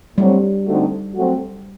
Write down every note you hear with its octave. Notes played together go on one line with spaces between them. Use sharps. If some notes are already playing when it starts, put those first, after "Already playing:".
A2 F#3 G3 C4
D3 A3 C4 D#4 F#4
F#3 A3 C4 F#4